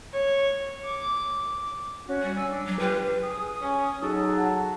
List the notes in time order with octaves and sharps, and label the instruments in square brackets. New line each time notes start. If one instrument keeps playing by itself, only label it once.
[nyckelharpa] C#5
D6
[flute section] C#4 F#4
[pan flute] G3
[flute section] G#5 E6
D4
[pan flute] F#3
[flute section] F4 G4 G5 [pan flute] B4
[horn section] G#4 [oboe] D#6
[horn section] C#4
[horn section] F#3 [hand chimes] D#4 G#4 [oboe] A4
[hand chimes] F#5 A5